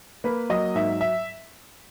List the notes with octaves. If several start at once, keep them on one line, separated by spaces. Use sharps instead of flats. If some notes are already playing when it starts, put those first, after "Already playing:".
A#3 B4
F#3 D#5
G#2 E5
E5